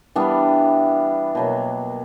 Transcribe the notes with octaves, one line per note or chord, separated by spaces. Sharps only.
E3 G3 B3 D4
B2 F#3 A#3